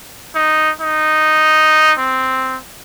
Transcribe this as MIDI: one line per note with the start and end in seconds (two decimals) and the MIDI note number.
0.35 0.70 63
0.81 1.92 63
1.98 2.57 60